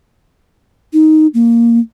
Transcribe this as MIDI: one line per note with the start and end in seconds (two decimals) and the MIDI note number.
0.93 1.27 63
1.34 1.80 58